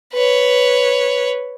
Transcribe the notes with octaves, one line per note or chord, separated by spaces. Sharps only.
B4 C#5